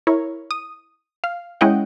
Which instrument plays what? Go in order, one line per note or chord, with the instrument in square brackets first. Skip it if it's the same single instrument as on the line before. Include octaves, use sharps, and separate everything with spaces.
[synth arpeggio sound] E4 A#4 C#5
D#6
F5
G#3 C#4 E4 D#5 F#5 G5